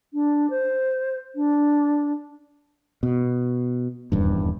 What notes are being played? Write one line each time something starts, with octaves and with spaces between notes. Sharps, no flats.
D4
C5
D4
B2
D#1 E2 G2